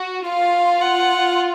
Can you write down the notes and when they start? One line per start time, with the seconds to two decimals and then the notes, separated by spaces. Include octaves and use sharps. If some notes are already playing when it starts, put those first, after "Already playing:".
Already playing: F#4
0.28 F4 F5
0.81 F#5